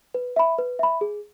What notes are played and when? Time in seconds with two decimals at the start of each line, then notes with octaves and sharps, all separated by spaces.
0.14 B4
0.36 E5 B5
0.58 B4
0.79 E5 B5
1.01 G#4